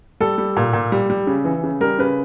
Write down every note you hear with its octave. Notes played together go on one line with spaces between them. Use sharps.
G3 A4
G3
A#2
A#2
G3
G3
C#3
E3
C#3
G3 A#4
C#3 B4